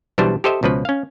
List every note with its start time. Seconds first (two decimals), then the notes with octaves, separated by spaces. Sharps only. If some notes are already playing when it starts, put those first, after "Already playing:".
0.18 B1 B2 E3 G3 D4 C5
0.44 G4 A4 C5 D#5 E5
0.63 C#2 B2 F3 B4
0.85 C#4 F5